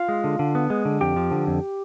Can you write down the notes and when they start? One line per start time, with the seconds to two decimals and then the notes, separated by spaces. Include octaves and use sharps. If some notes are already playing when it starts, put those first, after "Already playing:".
Already playing: F4 F5
0.09 G#3
0.24 D3
0.39 D3
0.55 B3
0.70 G#3
0.85 D3
1.01 F2 G4 G5
1.16 F3
1.31 D3
1.47 F2